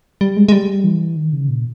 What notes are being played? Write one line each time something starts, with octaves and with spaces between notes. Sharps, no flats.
G3
G#3
G#3
G3
E3
D#3
C#3
A#2